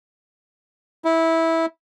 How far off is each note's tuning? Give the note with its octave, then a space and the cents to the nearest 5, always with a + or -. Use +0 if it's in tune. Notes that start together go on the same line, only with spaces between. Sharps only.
E4 -15